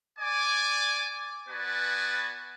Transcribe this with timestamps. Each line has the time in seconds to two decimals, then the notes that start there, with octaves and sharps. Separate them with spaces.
0.19 D5 G#5 D6
1.49 B3 F#4 B4 D5 G#5 A5